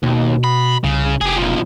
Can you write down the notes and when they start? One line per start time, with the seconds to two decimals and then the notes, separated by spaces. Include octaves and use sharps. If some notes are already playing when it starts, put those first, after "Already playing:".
0.03 D#2 B2
0.44 B5
0.84 C2 C#3
1.21 F1 G4 G#4
1.37 B1 F3